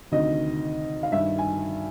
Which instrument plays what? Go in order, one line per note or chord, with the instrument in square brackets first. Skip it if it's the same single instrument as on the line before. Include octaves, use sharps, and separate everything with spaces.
[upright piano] D2 C3 D#3 D#5
F5
G2 D#3 E5
G#5